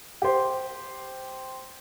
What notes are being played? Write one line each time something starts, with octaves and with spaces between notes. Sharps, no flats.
G4 C5